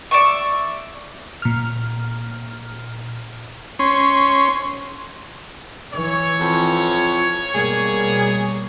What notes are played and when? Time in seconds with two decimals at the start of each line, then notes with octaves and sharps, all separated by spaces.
0.11 D5 E5 C#6
1.42 A#2 F6
3.79 C#4 C6
5.92 E3 C#5
6.40 F2
7.54 B2 G3 A#3 G#4